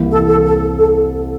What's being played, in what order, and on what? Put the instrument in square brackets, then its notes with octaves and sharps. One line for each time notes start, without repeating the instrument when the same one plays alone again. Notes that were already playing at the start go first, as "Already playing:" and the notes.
Already playing: [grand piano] C2 C3 E3 A#3 E4
[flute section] A4
A4
A4
A4